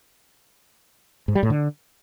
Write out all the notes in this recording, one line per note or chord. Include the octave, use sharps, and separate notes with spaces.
G#2
G3
A2
D3